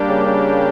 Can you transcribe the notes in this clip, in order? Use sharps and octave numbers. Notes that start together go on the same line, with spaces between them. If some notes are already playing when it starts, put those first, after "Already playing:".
Already playing: G3 A#3 D4 G4
C#3
C#3